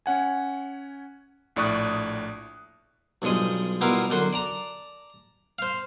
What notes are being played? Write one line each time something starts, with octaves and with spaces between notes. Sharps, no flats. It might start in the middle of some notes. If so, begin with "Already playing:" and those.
C#4 F#5 G#5
A#1 A2 D5 C#6 D#6 F#6
B1 G2 F3 G#3 D#5
B2 G3 B3 E4 F4 A#4
F#2 D3 F#4 C6
D5 A5 A#5
C5 F5